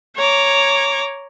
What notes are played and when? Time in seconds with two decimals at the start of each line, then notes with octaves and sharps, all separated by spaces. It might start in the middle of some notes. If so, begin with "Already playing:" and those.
0.16 C#5 A#5 D6